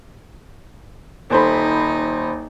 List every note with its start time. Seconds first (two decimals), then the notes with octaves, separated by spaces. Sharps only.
1.30 D#1 D#4 C5 B5